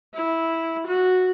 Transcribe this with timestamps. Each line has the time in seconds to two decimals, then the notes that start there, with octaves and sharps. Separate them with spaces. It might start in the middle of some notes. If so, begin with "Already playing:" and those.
0.14 E4
0.87 F#4